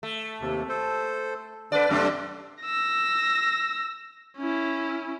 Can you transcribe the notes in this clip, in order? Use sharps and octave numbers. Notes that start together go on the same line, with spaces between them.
A3
D#2 C3
A4 C5
D3 D4 B4 D5
F#2 C3 A3 D4 G4 A4
E6 A#6
C#4 E4